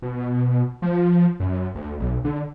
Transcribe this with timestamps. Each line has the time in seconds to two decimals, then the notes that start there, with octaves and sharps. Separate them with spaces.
0.02 B2
0.82 F3
1.40 F#2
1.75 D2
2.00 B1
2.25 D3